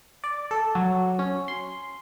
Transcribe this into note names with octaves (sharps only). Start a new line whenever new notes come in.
D5
A4
F#3
C#4
C6